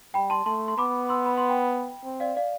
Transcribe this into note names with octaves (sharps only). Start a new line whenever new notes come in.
G3 G5 B5
A5 C6
A3 A5 C6
C6
B3 B5 D6
C6 E6
B5
C6
G5 B5
C4
D5 F5
D5 F5